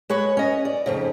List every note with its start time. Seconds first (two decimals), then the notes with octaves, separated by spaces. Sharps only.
0.10 G#3 B4 C#5
0.37 C#4 D#5
0.65 D5
0.86 F2 G#2 C#3